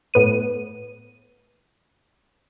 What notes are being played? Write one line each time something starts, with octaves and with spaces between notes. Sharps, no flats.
A2 B3 D#7